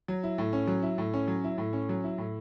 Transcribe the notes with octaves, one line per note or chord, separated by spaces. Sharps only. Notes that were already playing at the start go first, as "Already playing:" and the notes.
F#3
E4
A2
C#4
F#3
E4
A2
C#4
F#3
E4
A2
C#4
F#3
E4
A2